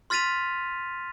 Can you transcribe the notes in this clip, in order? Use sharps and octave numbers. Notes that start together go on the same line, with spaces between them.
C6 F6 A6 B6 D#7 F7